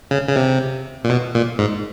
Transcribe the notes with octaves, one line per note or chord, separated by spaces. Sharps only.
C#3
C#3
C3
A#2
B2
A#2
G#2